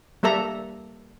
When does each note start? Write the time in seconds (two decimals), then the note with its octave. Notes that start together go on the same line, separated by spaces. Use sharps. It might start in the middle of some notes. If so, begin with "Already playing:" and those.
0.23 G3 A#3 A4 E5 A#5